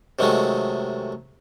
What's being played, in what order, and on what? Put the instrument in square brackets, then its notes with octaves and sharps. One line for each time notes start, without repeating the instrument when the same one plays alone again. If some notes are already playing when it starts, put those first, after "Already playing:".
[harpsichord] C3 D#3 F#3 G#3 A3